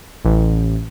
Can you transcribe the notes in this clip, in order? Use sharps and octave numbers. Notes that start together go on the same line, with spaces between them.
A1